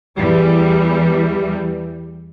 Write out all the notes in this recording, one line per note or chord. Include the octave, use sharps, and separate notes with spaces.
E2 E3 G3